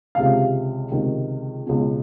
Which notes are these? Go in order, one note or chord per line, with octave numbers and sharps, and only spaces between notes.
C#2 C3 D#3 F5
C#2 C3 D#3
C#2 B2